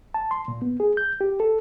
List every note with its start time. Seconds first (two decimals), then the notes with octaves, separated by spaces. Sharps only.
0.14 A5
0.31 C6
0.48 A#2
0.62 B3
0.80 G#4
0.97 G6
1.21 G4
1.40 A4